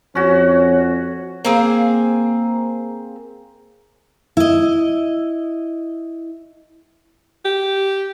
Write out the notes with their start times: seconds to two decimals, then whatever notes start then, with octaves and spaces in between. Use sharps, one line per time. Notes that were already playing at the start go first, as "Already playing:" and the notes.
0.15 F2 C#4 F#4 C#5
1.45 A#3 C4 G#4
4.37 E4 D#5
7.45 G4